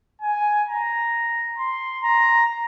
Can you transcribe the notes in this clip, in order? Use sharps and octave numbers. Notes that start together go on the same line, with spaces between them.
G#5
A#5
C6
A#5